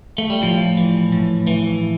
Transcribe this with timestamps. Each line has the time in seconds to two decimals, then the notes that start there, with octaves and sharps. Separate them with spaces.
0.18 A3
0.30 G3
0.42 A2 F3
0.77 E3
1.12 A2
1.47 E3